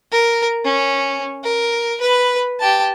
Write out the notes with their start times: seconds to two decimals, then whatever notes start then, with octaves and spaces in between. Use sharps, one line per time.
0.12 A#4
0.65 C#4
1.44 A#4
2.01 B4
2.60 G4 A5